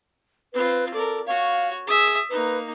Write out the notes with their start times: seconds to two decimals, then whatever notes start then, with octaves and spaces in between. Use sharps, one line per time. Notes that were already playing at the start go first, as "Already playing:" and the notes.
0.54 C4 F4 B4
0.94 A4 A#4 D5
1.27 F#4 C#5 F5
1.87 G#4 E5 D#6
2.30 A#3 D#4 B4